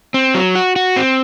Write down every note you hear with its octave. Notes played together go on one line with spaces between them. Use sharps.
C4
F#3
F#4
F#4
C4